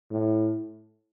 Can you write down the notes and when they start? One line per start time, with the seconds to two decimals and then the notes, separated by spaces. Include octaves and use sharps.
0.11 A2